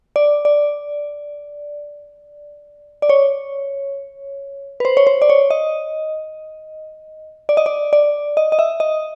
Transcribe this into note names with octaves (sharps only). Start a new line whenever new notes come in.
D5
D5
D5
C#5
B4
C5
C#5
C5
D5
C#5
D#5
D5
D#5
D5
D5
D#5
D#5
E5
D#5